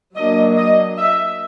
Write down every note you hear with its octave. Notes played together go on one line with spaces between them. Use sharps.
F#3 A#3 D4 D#5
D#5
E5